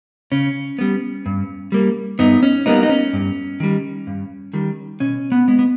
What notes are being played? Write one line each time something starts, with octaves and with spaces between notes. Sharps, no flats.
C#3 C#4
G3 B3
G2
G3 A#3
G2 B3 D#4
C#4
G3 A#3 B3 D#4
D#4
C#4
G2
D#3 G3
G2
D#3 G3
B2 C#4
B3
G#3 B3
B3